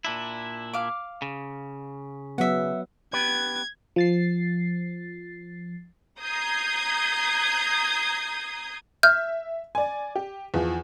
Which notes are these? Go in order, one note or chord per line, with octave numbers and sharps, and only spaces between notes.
A#2 D4 E4
F5 D6
C#3
F#3 B3 E5 F#5
B3 G4 B4 G#6
F3 A6 C7
A#5 D#6 G6 G#6 C7
E5 F6 G6
D5 G#5
G4
E2 E3 F3